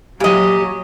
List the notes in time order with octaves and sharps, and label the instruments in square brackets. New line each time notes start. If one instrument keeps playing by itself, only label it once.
[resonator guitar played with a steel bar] A#2 D#5 [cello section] F#3 [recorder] G4